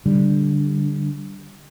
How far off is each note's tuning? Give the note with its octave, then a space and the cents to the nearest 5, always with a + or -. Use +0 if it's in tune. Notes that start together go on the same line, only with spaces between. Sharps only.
D3 -5 G3 +0